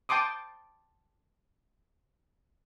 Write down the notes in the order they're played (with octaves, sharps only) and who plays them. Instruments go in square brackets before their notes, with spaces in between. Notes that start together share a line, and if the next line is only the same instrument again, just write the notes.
[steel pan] G5 A5 C6 D6 D#6